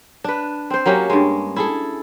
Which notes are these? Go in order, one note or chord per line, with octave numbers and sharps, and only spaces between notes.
D4 B4
C4 C5
F#3 A#3 C#4 G4
G2 G#3
E4 G#4 A4